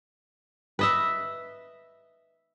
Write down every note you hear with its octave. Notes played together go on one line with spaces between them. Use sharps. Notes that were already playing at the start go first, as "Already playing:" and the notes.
B4 D#5 E5